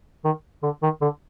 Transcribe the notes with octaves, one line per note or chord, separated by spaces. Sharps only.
D#3
D3
D#3
D3